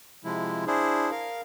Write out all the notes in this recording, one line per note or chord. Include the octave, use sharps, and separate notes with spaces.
C3 F3 G#3 E4
D4 E4 G#4 C5
A#4 F5